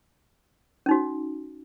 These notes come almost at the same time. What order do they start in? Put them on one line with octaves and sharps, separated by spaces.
C#4 D#4 F#4